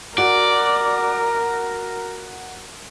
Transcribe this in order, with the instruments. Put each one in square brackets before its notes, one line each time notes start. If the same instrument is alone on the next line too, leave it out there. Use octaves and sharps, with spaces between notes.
[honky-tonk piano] F#4 [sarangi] A#4 [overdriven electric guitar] D5